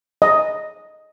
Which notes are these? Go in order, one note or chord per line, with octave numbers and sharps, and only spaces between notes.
D#5